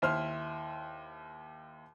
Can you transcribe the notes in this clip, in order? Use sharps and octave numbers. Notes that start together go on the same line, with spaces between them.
D#2 E4 C5 C6 F6